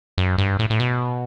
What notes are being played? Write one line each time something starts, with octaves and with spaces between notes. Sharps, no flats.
F#2
G2
A2
A2
B2